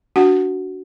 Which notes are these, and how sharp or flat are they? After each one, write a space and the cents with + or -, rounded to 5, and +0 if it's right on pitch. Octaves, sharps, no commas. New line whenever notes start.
D4 -15 F#4 +10 F#5 +0